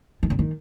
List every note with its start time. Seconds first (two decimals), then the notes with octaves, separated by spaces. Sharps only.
0.23 D#3
0.30 C#3
0.39 D#3